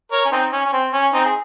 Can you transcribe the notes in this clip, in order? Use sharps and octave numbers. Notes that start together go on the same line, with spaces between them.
A#4 C#5
C#4
C4 D#4
C#4
C#4
C4
C#4
C4 D#4
G#4